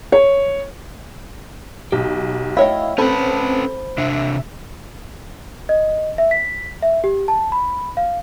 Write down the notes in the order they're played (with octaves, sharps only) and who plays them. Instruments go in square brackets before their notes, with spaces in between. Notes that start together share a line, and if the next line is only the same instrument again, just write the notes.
[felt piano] C#5
[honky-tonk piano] B1 [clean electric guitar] G4
[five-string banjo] A3 C#5 G5 [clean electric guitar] E4 D#5 [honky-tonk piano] F5
[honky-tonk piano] C4 A4 [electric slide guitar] C#4 B4 [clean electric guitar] C5 A5 B5
[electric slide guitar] C3 D4 [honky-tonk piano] E5
[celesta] D#5
E5
B6
E5
G4
A5
B5
F5